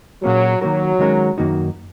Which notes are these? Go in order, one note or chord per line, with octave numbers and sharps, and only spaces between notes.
A#2 F#3 A#3 C#4 G#4 C#5
D#3 F#3 A#3 F#4 A#4
D#3 G#3 C#4 A#4
F#2 D#3 A#3 D#4 F#4